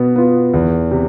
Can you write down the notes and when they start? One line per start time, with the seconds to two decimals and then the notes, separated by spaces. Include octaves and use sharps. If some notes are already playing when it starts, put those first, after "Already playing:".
Already playing: B2 B3
0.16 B3 F4
0.54 E2
0.91 C3